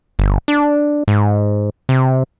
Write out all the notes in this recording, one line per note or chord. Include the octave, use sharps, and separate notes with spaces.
G1
D4
G#2
C3